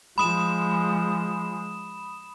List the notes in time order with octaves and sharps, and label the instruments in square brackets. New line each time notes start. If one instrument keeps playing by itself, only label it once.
[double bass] F3 G#3 [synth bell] B5 D#6 E7